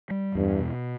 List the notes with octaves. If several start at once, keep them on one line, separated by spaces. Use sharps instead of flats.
G3
E2 G2
B2